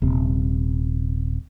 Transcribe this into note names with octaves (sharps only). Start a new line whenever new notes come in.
D#1 C3